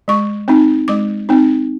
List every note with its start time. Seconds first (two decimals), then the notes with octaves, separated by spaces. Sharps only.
0.08 G#3 C#6
0.48 C4 D#4
0.88 G#3 D6
1.29 C4 D#4